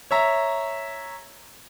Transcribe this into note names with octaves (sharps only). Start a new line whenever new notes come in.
C#5 E5 A#5